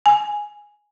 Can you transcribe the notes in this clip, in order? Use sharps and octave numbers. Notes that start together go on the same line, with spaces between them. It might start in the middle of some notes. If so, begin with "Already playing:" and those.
G#5